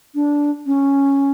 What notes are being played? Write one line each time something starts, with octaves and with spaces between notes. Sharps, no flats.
D4
C#4